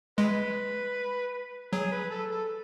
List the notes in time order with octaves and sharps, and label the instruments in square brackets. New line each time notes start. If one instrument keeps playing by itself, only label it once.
[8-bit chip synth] G#3 [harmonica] G#4 B4
[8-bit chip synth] F#3 [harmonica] G#4
[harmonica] B4
A4
A4